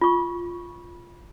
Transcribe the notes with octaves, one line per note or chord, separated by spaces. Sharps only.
F4 C#6